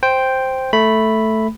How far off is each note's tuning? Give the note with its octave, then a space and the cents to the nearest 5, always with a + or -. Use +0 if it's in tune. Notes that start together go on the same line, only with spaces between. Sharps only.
C5 +0 G5 +0
A3 +0 B5 +0